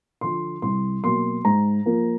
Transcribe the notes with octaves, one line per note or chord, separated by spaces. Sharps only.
D3 F3 C6
C2 C6
B2 F#3 A#3 C6
G#2 A#5
F3 A#3